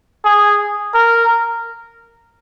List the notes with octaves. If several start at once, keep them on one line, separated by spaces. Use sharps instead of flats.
G#4
A#4